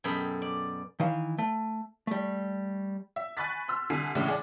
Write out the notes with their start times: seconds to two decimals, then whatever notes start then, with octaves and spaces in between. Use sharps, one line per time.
0.04 F#2 B2 G#4 A4 G5 B5
0.42 D5
1.00 D#3 E3 F5
1.38 A3
2.07 G3 A3
3.16 E5
3.37 G#5 B5 C#6 F#6 A6 B6
3.68 C6 E6 F6
3.90 C2 D3 G#5 B6 C7
4.15 A2 C#3 E3 G#3 D4 E4
4.28 G#4 D5